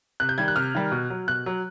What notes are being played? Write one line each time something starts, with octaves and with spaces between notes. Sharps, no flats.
C3 F#6
G6
D#3 G3 G#6
F#6
C3 F6
D#3 G3
B2
F#3
B2 F#6
F#3